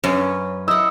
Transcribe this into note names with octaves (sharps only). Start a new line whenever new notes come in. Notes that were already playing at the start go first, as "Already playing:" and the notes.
F#2 C#4 B4
E4 D#5 F#5 E6